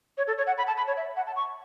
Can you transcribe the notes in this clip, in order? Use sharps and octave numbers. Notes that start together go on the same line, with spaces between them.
C#5
A4
C#5
F#5
B5
A5
B5
C#5
E5
F#5
A5
C#6